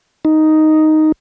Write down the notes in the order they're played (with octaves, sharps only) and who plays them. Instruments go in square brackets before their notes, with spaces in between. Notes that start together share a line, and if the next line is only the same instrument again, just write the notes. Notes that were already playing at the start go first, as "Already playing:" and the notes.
[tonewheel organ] D#4